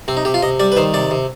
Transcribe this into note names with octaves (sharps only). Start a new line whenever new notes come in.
C3 C4
D#4
C3 G4
F4
C3 D#5
G3 D5
B4
D#3 C5
C3 D5
C3